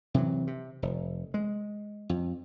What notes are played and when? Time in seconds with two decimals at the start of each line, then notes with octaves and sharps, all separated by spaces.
0.14 C3 E3 F#3
0.47 C3
0.82 F1
1.34 G#3
2.09 F2